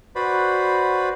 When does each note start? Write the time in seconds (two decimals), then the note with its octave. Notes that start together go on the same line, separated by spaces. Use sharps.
0.15 F#4 B4 C5 D5 B5